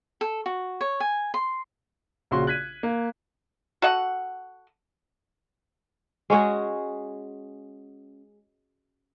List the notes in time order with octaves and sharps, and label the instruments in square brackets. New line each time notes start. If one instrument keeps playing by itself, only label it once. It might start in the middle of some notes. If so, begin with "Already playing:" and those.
[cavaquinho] A4
F#4
C#5
G#5
C6
[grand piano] A#1 C#3 F#4 C6
F#6 G#6 B6 D#7
A#3
[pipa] F#4 A4 D#5 F#5
[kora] G#3 C#4 F#4 G#4